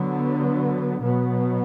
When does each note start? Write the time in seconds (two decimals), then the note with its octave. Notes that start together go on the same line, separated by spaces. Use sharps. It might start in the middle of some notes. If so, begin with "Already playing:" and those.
Already playing: D3 F#3 B3
1.02 B2 F#3 B3